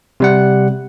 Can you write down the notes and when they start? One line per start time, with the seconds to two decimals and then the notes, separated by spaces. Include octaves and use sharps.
0.20 C3 G3 F#5